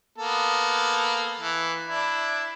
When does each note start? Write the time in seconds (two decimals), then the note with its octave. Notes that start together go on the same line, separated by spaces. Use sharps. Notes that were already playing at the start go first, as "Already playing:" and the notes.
0.18 A#3 B3 A4
1.40 E3
1.88 D4 E4